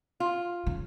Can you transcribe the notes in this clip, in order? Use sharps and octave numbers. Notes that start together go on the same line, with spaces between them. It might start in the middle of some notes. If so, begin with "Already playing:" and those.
F4
C#3